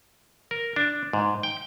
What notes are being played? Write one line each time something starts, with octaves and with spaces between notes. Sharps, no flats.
A#4
D4
G#2
G5